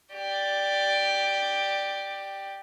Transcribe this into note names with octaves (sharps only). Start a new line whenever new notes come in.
G4 D5